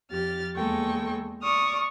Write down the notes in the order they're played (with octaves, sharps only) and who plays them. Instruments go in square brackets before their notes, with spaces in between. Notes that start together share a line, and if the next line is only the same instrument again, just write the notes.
[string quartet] F2 G4 F6 A6
E2 G#3 A#3 A4 G5 C#6
D5 C#6 D#6 F6